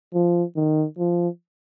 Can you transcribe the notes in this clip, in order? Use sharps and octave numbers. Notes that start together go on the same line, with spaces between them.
F3
D#3
F3